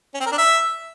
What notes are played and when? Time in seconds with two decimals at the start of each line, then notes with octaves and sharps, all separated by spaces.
0.14 C#4
0.20 C4
0.26 A#4
0.32 D4
0.38 E5